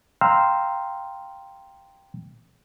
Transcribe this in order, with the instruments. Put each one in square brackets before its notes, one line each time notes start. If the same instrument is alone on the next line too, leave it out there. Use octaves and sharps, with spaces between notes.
[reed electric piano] F5 G5 A#5 C6 E6 F6